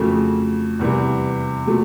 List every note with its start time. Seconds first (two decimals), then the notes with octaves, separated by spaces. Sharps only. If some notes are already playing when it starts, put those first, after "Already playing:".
Already playing: F2 C#3 F#3 A3
0.79 E2 C3 E3 G3
1.66 A#2 F#3 A3